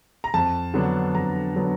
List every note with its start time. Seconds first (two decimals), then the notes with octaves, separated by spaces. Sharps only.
0.24 A#5
0.34 F2 A5
0.74 D3 F#3 B3 D4
1.14 F2 A#5
1.55 D3 F#3 B3 D4